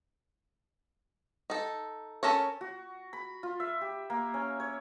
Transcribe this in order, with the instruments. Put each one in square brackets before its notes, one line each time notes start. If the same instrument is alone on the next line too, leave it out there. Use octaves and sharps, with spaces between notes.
[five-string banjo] D#4 A4
C#4 A4 A#4 C#5
[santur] F#4
B5
F4
E5
G4
A#3
C#4
C#5